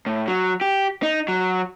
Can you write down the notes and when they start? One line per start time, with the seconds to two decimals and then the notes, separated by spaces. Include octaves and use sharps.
0.06 A2
0.27 F#3
0.61 G4
1.03 D#4
1.28 F#3